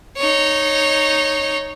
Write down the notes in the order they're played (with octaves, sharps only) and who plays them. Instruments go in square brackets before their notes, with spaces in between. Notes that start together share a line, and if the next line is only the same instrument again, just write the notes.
[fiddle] D#4 C#5